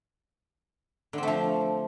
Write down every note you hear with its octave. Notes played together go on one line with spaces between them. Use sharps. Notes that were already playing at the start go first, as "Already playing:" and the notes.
D3 F3 A3 C4